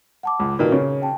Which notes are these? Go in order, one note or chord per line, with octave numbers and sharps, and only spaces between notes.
F#5 A5 D6
C#2
A#2 D#3 A#3 F#4 B4 D#5
C#3 C#5
G5 A5